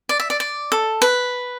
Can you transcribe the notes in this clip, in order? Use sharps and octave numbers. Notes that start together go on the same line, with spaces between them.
D5
E5
D5
D5
A4
B4